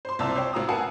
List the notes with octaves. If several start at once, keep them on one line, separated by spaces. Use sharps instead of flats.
C5 C6
C2 C5 D5 A5 A#5 E6
C5 C#5 G5
A1 F#4 A#5 D#6
A#4 B4 F5 F#5 G#5 A5